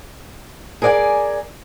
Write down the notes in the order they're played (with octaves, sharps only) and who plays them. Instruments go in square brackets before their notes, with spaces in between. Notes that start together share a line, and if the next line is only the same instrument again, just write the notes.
[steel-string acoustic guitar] G#4 A#4 D5 F5 G#5